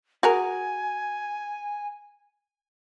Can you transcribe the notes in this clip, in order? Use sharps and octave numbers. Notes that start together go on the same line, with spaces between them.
F#4 G#4 A#4 G#5